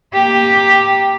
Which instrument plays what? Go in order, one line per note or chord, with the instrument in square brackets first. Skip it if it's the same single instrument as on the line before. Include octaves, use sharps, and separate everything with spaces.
[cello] A#3 G4